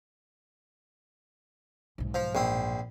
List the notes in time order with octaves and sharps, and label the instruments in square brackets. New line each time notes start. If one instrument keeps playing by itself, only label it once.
[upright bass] B1 G#2
[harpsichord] F3
A#1 C4